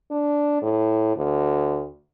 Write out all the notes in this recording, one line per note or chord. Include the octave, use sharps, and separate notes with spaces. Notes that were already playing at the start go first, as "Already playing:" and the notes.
D4
A2
D2